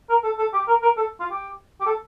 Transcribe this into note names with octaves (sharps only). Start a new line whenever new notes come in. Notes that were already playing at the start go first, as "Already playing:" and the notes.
A#4
A4
A4
G4
A#4
A#4
A4
F4
G4
G4
A4